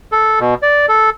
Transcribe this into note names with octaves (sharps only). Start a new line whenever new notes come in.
A4
B2
D5
A4